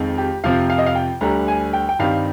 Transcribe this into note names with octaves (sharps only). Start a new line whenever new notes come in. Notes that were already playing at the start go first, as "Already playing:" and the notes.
Already playing: F2 D#3 G#3 C4
G4
F2 C3 F3 C4 F5
F5
D#5
F5
G5
D2 D3 G3 A#5
G#5
G5
G5
G2 D#3 G3 C4 F5